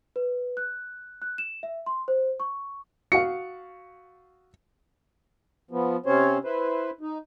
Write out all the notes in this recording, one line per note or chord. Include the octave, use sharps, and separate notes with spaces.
B4
F#6
F#6
E7
E5
C6
C5
C#6
F#4 F5 C#7
F3 B3
C3 C4 C#4 C5 C#5
E4 B4 C5
D#4